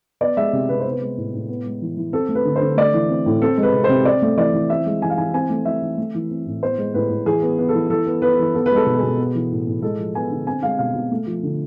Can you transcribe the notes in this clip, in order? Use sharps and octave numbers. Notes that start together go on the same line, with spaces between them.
B3 D5
G#3 E5
C3
C3 B4
B3 C5
B4
G#3
A2
A2
B3
G#3
E3
E3
C4 A4
A3
B4
D3
C5
D3
A3 D5
E3
C4
A2
C4 A4
G#3
B4
C3
C5
C3
C4 D5
A3
E3 D5
E3
C4 E5
G#3
E3 G#5
F5
E3 G#5
C4 G#5
A3
E3 E5
E3
A3
E3
C4
A2
B3 C5
G#3
A2 B4
A2
E3 G#4
B3
B3
A4
E3
E3 A4
B3
B3 B4
E3
B3 A4
B4
G#3
A4
B2
G#4
B2
B3
E3
A2
A2
G#3 A4
F3
B3 G#5
D3
C4 G#5
G#3 F5
B2 F5
B2
A3
F3
D3